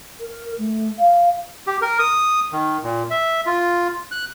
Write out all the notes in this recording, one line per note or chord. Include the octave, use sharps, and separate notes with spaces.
A#4
A3
F5
G4
A#4
D#6
D#3
A#2
E5
F4
F#6